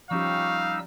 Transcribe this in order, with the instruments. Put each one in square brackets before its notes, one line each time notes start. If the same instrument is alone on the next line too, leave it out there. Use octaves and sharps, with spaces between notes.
[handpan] F3 C#4 G4 [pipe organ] G3 D#4 E6 [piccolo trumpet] F5 [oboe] C#6